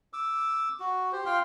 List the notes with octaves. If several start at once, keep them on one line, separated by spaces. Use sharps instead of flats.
D6 E6
F#4
G4 C5
F4 F5 G5 C6